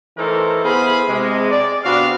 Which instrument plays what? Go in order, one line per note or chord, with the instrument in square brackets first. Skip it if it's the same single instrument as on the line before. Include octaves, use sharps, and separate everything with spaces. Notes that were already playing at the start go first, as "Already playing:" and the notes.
[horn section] E3 A3 D#4 A4 A#4 C5
B3 E4 G#4 C5 F5 B5
C3 G#3
D5
C3 B3 D4 F#4 F5